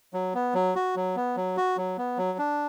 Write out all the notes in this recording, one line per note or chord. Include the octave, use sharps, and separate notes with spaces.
F#3
B3
F#3
F#4
F#3
B3
F#3
F#4
F#3
B3
F#3
D4